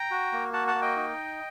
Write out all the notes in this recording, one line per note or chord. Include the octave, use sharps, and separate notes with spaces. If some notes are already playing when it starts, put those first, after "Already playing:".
Already playing: G5 A#5
F#4
A#3
F#4 F#5 A5
F#5 A5
A#3
D#5 G5
D#4